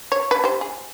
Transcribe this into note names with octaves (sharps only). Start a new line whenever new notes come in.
C#5
B4
G4 C5
G#4